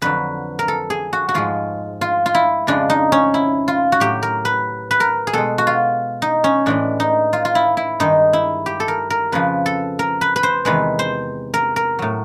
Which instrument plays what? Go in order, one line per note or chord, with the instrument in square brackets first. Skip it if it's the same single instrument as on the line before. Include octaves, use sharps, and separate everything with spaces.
[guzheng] F2 D3 F#3 B4
A#4
A4
G#4
F#4
F#4
G#2 F3 G#3 F4
F4
F4
E4
F2 C#3 F3 G#3 D4
D#4
C#4
E4
F4
F#4
A2 F#3 G4
A#4
B4
B4
A#4
G#4
B2 G#3 A4
F#4
F4
D#4
C#4
A2 E3 G#3 D4
D#4
F4
F4
E4
E4
G2 D#3 G#3 D#4
E4
G4
A4
A#4
A#4
F2 C#3 F3 B4
A4
A#4
B4
B4
C5
E2 C3 D#3 G#3 B4
C5
A#4
A#4
A2 F#3